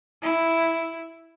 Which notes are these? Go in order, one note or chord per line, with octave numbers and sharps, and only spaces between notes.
E4